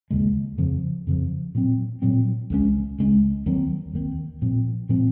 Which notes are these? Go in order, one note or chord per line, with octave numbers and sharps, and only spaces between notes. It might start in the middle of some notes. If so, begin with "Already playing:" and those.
D#2 C#3 G#3
F2 C#3 F3
F2 C#3 F3
A#2 F#3 C4
A#2 F#3 C4
C#2 C#3 G#3 C#4
C#2 C#3 G#3 C#4
D#2 D#3 F#3 C4
D#2 D#3 F#3 C4
A#2 F3 C4
A#2 F3 C4